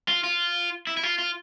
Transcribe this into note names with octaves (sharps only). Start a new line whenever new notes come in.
F4
F4
E4
E4
F4
F4